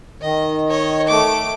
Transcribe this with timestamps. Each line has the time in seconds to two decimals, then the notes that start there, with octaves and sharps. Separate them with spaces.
0.21 D#3 D#5
0.69 C#5 D#5
1.07 A3 D6